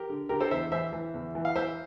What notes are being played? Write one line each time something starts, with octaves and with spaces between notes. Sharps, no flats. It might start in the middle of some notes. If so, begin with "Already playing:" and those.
Already playing: G4 A#4
D3
D3 G4 A#4
A4 C5
E2 C5 E5
E3 C5 E5
E3
E2
E3
F5
E3 C5 E5